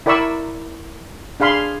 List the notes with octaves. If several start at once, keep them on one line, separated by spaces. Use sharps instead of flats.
E4 A#4 D5 B5 C#6 E6
D4 G#4 F5 B5 C6